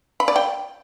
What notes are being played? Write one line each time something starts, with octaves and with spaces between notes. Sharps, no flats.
B5
D5
G5